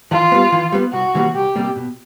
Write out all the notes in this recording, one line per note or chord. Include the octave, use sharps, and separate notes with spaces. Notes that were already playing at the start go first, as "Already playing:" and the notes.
E3 F4
G3 B3
E3
G3 B3
C2 F#4
C3 E3 G3 A#3
C2 G4
C3 E3 G3 A#3
B2